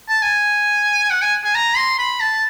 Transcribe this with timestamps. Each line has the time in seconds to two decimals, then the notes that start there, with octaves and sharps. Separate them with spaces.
0.09 A5
0.22 G#5
1.10 F#5
1.22 G#5
1.44 G#5
1.55 A#5
1.76 C6
1.99 B5
2.20 A5